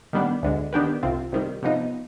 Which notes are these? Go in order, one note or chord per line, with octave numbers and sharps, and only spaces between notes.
D#3 G3 B3 D4
D2 D3 G#3
D#3 B3 D4 G4 B4
C2 C3 F3 C4
C3 D#3 G3
C3 F3 B3 D#4